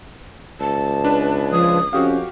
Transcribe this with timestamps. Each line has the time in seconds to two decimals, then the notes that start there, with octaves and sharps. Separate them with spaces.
0.60 C#2 A5
1.05 D4 B4
1.51 F3 D#6
1.93 F2 C#4 F#4 G4 F5